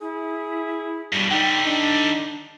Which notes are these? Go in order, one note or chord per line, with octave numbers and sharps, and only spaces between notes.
E4 G#4
G2 B2 G3
D3 G3 D#4 G5
D4 D#4